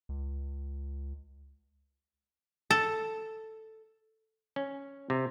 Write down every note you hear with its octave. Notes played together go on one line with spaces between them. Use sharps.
C#2
A4
C#4
C3